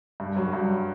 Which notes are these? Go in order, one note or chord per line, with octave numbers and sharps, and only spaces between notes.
G2
F#3
G2